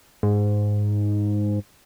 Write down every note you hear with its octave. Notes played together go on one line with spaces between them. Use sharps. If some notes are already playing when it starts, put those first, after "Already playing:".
G#2